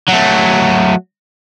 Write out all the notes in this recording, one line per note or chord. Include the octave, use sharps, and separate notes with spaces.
F#3 A3